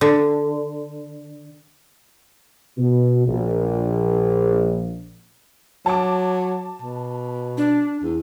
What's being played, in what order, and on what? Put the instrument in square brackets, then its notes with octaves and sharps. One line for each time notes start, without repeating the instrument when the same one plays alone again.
[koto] D3
[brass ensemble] B2
A#1
[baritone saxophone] F#3 [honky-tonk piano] A5 D6
[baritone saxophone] B2
[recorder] D4
[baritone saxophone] E2